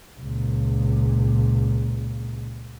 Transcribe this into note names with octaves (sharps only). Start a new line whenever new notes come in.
C#2 A#2